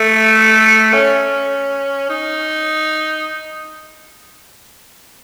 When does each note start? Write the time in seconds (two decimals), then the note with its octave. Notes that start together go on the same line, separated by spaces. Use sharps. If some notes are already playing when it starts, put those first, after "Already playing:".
Already playing: A3
0.93 C#4
2.10 D#4